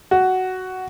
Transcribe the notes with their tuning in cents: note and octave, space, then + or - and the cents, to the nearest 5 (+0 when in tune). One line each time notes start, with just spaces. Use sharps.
F#4 +10